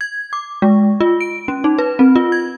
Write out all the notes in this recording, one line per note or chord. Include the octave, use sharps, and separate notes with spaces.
G#6
D6
G#3
F4
D7
C#4
D#4
B4
C4
F4
G#6